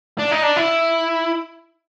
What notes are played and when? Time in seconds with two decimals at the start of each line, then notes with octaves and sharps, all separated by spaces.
0.19 D4
0.32 D#4
0.43 D4
0.57 E4